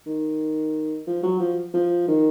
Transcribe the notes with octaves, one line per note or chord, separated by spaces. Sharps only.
D#3
F3
F#3
F3
F3
D#3